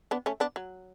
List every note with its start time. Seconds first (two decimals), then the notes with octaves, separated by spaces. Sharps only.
0.11 B3 D4
0.26 A3 C#4
0.40 B3 D4
0.56 F#3